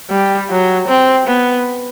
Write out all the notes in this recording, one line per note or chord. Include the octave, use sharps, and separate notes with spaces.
G3
F#3
C4
B3